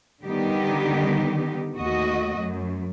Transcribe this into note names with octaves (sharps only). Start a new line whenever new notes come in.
D3 D#3 G3 B3 D#4 G4
D#2 A3 F#4 D#5
F#2